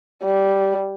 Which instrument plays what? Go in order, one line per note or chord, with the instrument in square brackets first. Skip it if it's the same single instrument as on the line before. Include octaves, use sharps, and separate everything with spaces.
[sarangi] G3